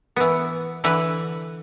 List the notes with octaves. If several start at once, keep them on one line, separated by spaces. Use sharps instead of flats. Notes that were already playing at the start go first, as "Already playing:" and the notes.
E3 B3
D3 E3 B4